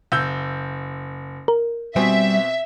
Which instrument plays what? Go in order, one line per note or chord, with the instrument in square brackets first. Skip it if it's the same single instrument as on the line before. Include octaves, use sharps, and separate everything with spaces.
[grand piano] F#1 E6 G6
[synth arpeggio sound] A#4
[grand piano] B2 C4 G#5 [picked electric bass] G3 [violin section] E5